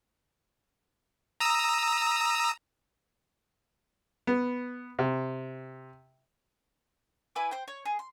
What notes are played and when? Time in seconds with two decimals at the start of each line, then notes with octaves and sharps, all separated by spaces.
1.40 A#5 D#6 E6
4.27 B3
4.99 C3
7.35 E4 B4 G#5 D6
7.51 C5 G5
7.68 C#5
7.85 G#4
7.99 C6